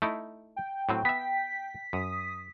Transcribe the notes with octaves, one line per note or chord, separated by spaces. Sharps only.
A3 D#4 E4
G5
A2 F#3 C4
B3 E5 B6
F#2 D#6